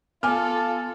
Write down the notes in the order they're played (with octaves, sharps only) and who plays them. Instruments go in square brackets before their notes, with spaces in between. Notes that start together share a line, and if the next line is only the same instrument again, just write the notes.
[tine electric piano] B3 [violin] F4 A4 [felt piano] G#5 D6 F6